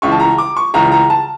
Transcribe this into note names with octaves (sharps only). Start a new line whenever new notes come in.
C#2 C#3 E3 C#6
A5
A#5
D6
C#6
C#2 C#3 E3 A#5
A#5
A5